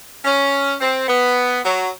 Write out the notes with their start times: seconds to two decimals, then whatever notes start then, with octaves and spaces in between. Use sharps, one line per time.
0.24 C#4
0.80 C4
1.08 B3
1.64 F#3